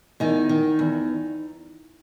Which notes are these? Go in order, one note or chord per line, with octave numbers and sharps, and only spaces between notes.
E2 D#3 D#4
D#3
E2